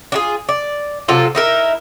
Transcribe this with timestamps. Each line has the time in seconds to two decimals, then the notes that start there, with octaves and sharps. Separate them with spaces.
0.12 D4 F4 G#4
0.49 D5
1.08 C3 F#3 F4 A4
1.35 D#4 E4 A#4